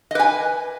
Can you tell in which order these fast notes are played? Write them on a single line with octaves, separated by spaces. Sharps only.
D#5 B4 G#5